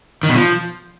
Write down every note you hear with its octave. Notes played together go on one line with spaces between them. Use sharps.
D#3
B2
F3